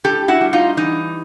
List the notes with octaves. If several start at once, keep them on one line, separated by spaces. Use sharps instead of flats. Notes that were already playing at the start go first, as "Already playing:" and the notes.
A2 G4 A4
E4 F#4
G3
D#4 F4
E3 D#4